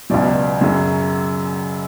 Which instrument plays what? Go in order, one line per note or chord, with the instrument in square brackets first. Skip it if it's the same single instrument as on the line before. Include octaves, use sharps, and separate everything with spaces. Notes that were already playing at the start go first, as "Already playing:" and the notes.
[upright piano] C#2 B2 F#3 D5
F#2 C#3 F#3